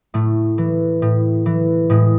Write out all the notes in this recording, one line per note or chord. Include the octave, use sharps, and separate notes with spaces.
A2 A3
E3
A2
E3
A2 G#3